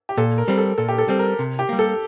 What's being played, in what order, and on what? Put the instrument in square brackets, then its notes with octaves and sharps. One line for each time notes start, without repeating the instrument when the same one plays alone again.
[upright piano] G4
[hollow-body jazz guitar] A#2 [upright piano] A4
[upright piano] A#4
[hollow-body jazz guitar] G3 C4
[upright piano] A4
[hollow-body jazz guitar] A#2 [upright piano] A4
[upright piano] G4
A4
[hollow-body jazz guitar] G3 C4
[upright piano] A#4
[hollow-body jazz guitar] C3
[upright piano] G4
[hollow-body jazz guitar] G3 A#3
[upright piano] A4